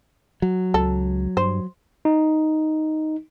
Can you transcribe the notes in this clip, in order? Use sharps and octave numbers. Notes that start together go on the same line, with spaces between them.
F#3
C#2 A4
G2 C5
D#4